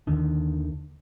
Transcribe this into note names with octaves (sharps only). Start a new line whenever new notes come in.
D#2 D3 D#3